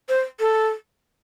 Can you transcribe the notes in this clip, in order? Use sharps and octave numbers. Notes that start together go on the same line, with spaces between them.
C5
A4